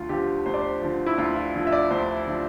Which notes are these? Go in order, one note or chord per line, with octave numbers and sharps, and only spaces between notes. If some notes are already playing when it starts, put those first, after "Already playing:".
Already playing: D2 F4
D3 F3 G4
D2 C5
D5
C5
D3 F3
E4
D2 F4
F4
D3 F3
E5
D5
D2 C5
D3 F3